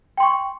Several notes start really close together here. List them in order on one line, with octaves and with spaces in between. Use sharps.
G5 C6 C#6